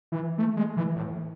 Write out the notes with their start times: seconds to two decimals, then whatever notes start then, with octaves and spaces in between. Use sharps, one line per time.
0.12 E3
0.38 A3
0.57 G#3
0.77 E3
0.96 A2